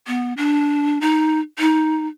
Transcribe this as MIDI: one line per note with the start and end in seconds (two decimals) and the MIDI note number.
0.07 0.33 59
0.37 0.99 62
1.01 1.40 63
1.59 2.08 63